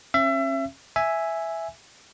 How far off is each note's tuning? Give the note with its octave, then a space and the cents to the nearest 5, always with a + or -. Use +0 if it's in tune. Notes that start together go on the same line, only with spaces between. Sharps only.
C#4 -40 E5 +30
E5 +0 G#5 +0